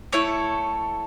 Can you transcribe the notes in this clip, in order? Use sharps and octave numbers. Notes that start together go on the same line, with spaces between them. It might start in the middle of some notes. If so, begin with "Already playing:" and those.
A3 E4 A4 C#5